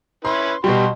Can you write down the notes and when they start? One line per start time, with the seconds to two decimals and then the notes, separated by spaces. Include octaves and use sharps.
0.25 C#4 E4 B4 C6
0.64 B2 G3 F#4 C6